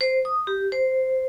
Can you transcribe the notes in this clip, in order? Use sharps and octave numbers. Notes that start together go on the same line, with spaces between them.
C5
D#6
G4
C5